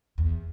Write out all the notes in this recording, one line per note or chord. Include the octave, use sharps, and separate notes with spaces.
E2